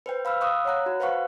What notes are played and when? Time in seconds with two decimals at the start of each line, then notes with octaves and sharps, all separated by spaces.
0.06 B4 C5 G5
0.25 F5 B5 E6 F6
0.41 F5 C#6 D#6 E6 F#6
0.65 C#5 F#5 A#5 F#6
0.86 F#4
1.00 B4 C5 F5 F#5 C#6 F#6